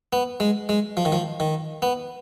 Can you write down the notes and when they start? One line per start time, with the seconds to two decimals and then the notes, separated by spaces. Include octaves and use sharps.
0.13 B3
0.40 G#3
0.69 G#3
0.97 F3
1.05 D#3
1.12 F3
1.40 D#3
1.82 B3